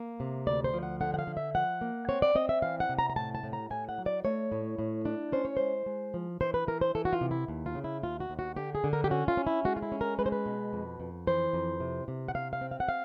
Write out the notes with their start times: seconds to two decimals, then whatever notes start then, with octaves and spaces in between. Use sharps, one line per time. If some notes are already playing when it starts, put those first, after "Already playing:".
Already playing: A#3
0.20 C3
0.46 D2 D5
0.64 C5
0.74 F3
0.83 F#5
1.01 D3 F#5
1.14 F#5
1.19 F5
1.27 D3
1.37 E5
1.55 F3 F#5
1.81 A#3
2.09 C4 C#5
2.22 D5
2.35 C4 D#5
2.49 E5
2.62 E3 F5
2.80 F#5
2.89 C3
2.99 A#5
3.10 A#5
3.16 A2 A5
3.35 A5
3.43 A2
3.53 A#5
3.71 A2 G#5
3.89 F#5
3.98 F#3
4.06 D5
4.25 A3 C#5
4.52 A2
4.79 A2
5.05 D4
5.32 C#4 C5
5.45 C#5
5.57 G#3 C5
5.86 G#3
6.14 F3
6.41 E3 C5
6.54 B4
6.67 E3 A#4
6.81 C5
6.95 E3 A4
7.05 F#4
7.13 F4
7.21 C3
7.31 E4
7.48 D#2
7.66 F4
7.75 C#3
7.84 E4
8.03 D#2 F4
8.20 F#4
8.30 D#2
8.39 F#4
8.56 D3 G4
8.75 G#4
8.84 D3
8.93 A#4
9.04 G4
9.10 C#4 F#4
9.28 F4
9.37 C#4
9.47 E4
9.65 G#3 F#4
9.77 F4
9.82 E4
9.92 C#4
10.01 A#4
10.19 G#3 B4
10.26 C5
10.32 B4
10.46 B2
10.73 F2
11.00 F2
11.27 E3 C5
11.53 F2
11.80 C3
12.08 C3
12.28 F#5
12.35 C3 F5
12.53 F5
12.61 C4
12.71 F5
12.80 F#5
12.89 F5